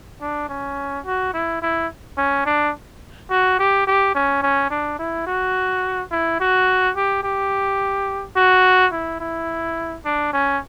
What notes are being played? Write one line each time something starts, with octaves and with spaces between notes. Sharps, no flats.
D4
C#4
F#4
E4
E4
C#4
D4
F#4
G4
G4
C#4
C#4
D4
E4
F#4
E4
F#4
G4
G4
F#4
E4
E4
D4
C#4